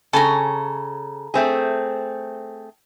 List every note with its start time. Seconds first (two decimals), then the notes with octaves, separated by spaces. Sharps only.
0.13 C#3 A4 G#5 A#5
1.34 A3 C4 G#4